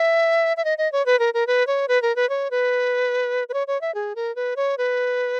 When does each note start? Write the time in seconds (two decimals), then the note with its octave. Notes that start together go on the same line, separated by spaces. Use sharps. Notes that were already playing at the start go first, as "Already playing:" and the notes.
Already playing: E5
0.57 E5
0.65 D#5
0.78 D#5
0.92 C#5
1.06 B4
1.19 A#4
1.34 A#4
1.47 B4
1.67 C#5
1.88 B4
2.02 A#4
2.16 B4
2.29 C#5
2.51 B4
3.49 B4
3.54 C#5
3.67 C#5
3.81 E5
3.95 G#4
4.16 A#4
4.36 B4
4.56 C#5
4.78 B4